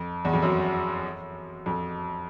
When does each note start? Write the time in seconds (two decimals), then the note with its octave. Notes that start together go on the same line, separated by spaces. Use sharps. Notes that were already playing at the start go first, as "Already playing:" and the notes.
Already playing: F2
0.25 E2
0.33 F2
0.42 F#2
1.66 F2